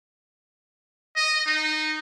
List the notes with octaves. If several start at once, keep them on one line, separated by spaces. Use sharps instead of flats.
D#5
D#4